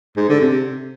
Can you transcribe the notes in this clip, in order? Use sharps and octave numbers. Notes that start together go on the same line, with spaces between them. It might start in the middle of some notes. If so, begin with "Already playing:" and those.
G#2
D3
C3